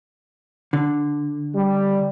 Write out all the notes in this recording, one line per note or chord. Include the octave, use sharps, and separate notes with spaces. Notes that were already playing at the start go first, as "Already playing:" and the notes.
D3
G3